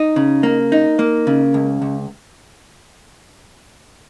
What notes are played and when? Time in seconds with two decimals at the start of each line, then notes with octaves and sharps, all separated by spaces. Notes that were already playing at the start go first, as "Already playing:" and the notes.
Already playing: D#4
0.16 C#3
0.43 A#3
0.72 D#4
0.99 A#3
1.27 C#3
1.54 C#2
1.82 C#2